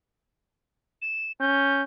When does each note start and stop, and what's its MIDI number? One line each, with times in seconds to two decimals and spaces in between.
1.02 1.32 100
1.40 1.83 61
1.40 1.82 91